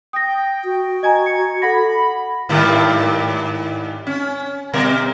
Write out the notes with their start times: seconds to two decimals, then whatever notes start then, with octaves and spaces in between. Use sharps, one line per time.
0.13 G5 D#6 A#6
0.64 F#4
1.03 D#5 G#5 A#5 G#6
1.26 C#7
1.62 A4 F#5 B5 A#6
2.49 G#2 D#3 G3
4.07 C#4
4.73 B2 G3 A#4